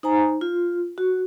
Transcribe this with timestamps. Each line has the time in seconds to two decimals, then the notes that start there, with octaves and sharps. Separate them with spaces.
0.03 D#4 C5 G#5 A#5
0.41 F4
0.98 F#4